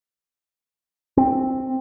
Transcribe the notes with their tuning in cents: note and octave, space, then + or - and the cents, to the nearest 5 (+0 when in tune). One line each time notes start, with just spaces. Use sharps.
C4 +5